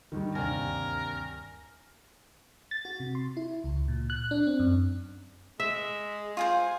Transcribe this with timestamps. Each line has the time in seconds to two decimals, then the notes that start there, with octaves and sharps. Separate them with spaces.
0.12 D2 G2 D#3 G3
0.35 D#2 C3 D4 A#4 D5 G#5
2.71 A6
2.85 F#4
3.00 C3
3.15 C6
3.37 E4
3.64 C#2
3.88 A#2
4.10 F#6
4.31 D4
4.47 C4
4.59 F#2
5.60 G#3 E5
6.37 F4 G#4 C5